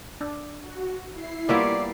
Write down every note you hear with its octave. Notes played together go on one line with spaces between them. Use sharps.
D4
F#4
E4 C7
G3 A#3 B3 F4 C#5 D5 E5